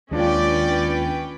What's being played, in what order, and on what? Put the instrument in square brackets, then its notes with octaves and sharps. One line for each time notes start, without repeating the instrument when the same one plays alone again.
[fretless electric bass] D#2 [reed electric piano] G#3 D4 F4 [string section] C#4 B4 G5 [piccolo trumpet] D5